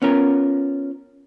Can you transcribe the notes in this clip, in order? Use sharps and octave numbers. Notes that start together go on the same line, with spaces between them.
B3 C#4 F4 A#4